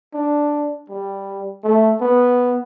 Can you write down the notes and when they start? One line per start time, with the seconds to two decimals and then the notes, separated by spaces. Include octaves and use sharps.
0.14 D4
0.89 G3
1.64 A3
2.00 B3